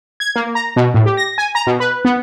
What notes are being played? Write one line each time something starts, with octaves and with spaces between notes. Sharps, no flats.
G#6
A#3
A#5
B2
A2
G4
A#6
G#5
A#5
B2
B4
B3